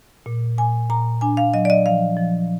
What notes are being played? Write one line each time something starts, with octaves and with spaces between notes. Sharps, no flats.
A#2
A#2 G#5
A#2 A#5
D4 G#5
F5
F#3 D#5
D5
D#5
F3 F5
F3